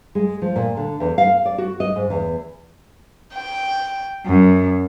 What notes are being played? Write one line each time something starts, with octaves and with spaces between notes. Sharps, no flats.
G#3
F3
A#2
D3
E2
F5
D5
F#4
D#5
G#2
E2
G5
F#2